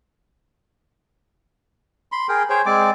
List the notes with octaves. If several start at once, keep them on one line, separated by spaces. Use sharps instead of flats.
B5 C6
G#4 A#4 G5
G#4 C5 C#5 G5
G#3 C4 D5 D6